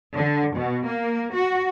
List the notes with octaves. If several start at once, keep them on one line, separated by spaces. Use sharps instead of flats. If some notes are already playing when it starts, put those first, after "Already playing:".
D3
B2
A#3
F#4